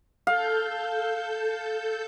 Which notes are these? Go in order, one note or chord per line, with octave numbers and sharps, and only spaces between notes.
A4 F5 G6